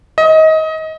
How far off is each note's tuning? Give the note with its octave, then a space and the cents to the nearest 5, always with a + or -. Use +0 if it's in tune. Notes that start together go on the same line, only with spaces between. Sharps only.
D#5 +25